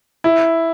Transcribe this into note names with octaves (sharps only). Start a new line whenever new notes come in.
E4